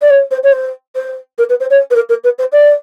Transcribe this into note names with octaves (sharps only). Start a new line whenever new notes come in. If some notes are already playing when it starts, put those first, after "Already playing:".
D5
C#5
C5
C#5
C5
C5
A#4
B4
C5
C#5
B4
A#4
A#4
B4
C5
D5